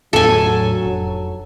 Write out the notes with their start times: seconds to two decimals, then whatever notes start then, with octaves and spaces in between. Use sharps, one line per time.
0.13 E1 A2 F#3 D4 A4 G#5
0.84 F1